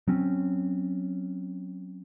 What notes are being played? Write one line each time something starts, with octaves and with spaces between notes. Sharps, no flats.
F#3 C4 C#4